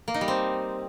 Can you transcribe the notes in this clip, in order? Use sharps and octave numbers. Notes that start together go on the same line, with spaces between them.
A#3
D#4
G3
C4